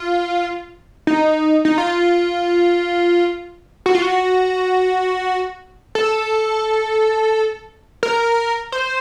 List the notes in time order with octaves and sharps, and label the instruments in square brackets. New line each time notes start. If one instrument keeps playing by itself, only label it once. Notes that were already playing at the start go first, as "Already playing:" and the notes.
Already playing: [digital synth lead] F4
D#4
D#4
F4
F#4
F4
F#4
A4
A#4
C5